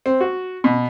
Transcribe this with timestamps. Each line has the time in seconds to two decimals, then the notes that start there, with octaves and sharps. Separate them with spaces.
0.06 C4
0.21 F#4
0.64 B2